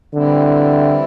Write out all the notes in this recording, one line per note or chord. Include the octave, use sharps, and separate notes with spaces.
D3 E3 G3 C4 E4